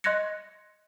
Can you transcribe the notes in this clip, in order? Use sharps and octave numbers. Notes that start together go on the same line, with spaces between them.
D#5 C6 F#6 G#6 A#6 C#7